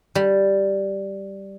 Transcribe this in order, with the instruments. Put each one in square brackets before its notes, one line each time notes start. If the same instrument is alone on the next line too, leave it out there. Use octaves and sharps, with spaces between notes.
[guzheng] G3